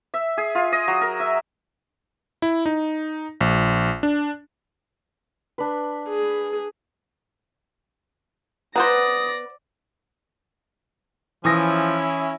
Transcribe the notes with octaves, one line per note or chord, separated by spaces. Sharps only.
E5
G#4
F4
D#5
F#3
A#4
E5
E4
D#4
A#1
D4
D4 B4
G#4
B3 B4 C5 D5 F#5 A#5 D#6 A#6
E3 F3 C#4 E4 D#6 A#6